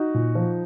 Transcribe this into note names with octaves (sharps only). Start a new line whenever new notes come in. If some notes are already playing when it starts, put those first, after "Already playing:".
Already playing: D#4 F#4
A#2
F3